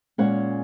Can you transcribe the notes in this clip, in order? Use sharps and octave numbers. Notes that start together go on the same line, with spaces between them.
A#2 G#3 C#4 C#5 F#5